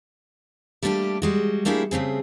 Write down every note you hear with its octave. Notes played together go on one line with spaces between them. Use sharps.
G3 A3 A#3 C4 D4 G4
G3 G#3 F#4
A3 A#3 D4 E4 G4 G#4
C#3 A3 C4 G#4